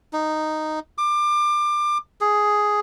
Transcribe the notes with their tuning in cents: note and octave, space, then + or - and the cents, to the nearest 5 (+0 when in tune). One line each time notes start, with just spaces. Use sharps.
D#4 -5
D6 +25
G#4 +5